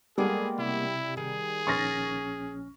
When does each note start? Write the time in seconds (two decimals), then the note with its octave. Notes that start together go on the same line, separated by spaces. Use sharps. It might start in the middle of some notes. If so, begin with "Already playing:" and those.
0.18 G3 G#3 A#3 B3 G#4 A4
0.58 C3 E4
1.17 D#3 G#4
1.67 A#1 C#4 C#6 F6 A6 A#6